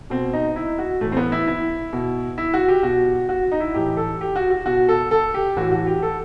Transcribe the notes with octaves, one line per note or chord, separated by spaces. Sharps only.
B2 C4
D#4
E4
F#4
A2 E3 A3
C4
B3
E4
E4
B2
E4
F#4
G4
B2 F#4
F#4
D#4
E4
A2 E3 G4
A4
G4
F#4
F#4
B2 F#4
A4
A4
G4
A2 E3 F#4
F#4
G4
A4